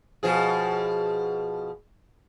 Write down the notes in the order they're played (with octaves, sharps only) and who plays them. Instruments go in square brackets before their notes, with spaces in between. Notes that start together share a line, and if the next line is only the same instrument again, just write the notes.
[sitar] B2 F3 G#4